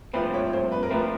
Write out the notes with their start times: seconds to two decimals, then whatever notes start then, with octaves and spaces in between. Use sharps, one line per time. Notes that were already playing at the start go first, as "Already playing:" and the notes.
0.13 C2 A#2 F3 A3 C4 B4
0.34 C#5
0.53 C5
0.72 B4
0.83 A#4
0.91 A#2 F3 A3 C4 B4